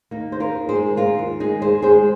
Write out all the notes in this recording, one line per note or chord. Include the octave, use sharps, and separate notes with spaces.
D#2 A#3 D#4
D#3 C5
F4 A#4
D#2
G#4 C5
G#3
D#2 F4 A#4
D#2
G#3 D#4 G#4
D#2 G#4 C5
G#3 G#4 C5